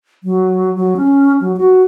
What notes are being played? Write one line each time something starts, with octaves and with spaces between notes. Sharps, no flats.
F#3
F#3
C#4
F#3
F#4